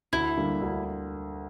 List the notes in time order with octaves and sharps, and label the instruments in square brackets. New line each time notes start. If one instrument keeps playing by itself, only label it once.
[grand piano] D2 [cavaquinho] E4
[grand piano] D3 G3 A#3
D2